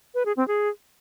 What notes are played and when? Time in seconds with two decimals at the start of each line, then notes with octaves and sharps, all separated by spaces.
0.15 B4
0.26 G#4
0.37 C4
0.48 G#4